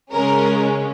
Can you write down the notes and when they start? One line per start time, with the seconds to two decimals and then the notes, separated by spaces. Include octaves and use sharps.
0.13 C#3 G#3 C#4 A#4